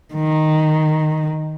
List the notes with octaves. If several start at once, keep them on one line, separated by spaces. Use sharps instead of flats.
D#3